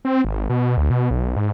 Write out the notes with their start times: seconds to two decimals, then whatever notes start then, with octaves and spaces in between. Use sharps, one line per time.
0.05 C4
0.25 G#1
0.50 B2
0.77 D2
0.90 B2
1.11 B1
1.36 G#2